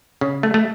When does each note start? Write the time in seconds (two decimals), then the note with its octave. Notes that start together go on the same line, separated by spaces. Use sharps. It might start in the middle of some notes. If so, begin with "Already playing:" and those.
0.21 C#3
0.43 A3
0.54 A3